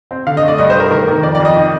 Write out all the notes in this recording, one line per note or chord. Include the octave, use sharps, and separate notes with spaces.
C4
D3 F5
D#5
A3 D5
G2 D#5
C5
A3 A#4
D#3 A#4
D#3 A#4
F2 D5
D5
F2
D#5
D#3